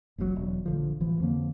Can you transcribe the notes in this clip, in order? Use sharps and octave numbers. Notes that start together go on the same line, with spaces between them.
F#1 C#2 A#2 F#3
E1 F#3
A#1 D3 F3
A1 E3 F3
F2 D3 F3 A#3